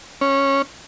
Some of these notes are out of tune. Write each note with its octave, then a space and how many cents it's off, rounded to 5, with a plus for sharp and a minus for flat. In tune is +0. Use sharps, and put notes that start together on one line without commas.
C#4 -15